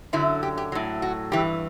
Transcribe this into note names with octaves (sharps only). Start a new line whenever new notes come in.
F#2 D3 F#3 E4
G4
G4
A2 F#3
F#4
G2 E3 G4